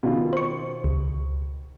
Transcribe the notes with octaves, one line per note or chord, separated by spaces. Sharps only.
B2 D#3 F4
C5 C#6
C#2